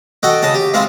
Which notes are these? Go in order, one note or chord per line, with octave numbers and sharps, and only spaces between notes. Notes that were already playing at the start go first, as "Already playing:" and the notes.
F#4 A4 D#5 G5
C#3 D#5 A5
G4
G#3 C4 E4 F4